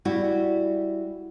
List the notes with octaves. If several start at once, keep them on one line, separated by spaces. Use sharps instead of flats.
G3 E4 F#4